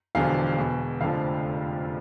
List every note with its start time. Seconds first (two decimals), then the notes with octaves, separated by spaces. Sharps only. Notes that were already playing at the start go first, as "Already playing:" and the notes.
0.15 E1 E2 D3 F3 F5
0.58 E2 B2
1.01 F1 F2 D3 F3 F5